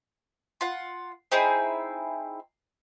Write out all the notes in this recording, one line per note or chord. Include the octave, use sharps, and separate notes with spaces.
F4 F#5
C4 D#4 E4 G#4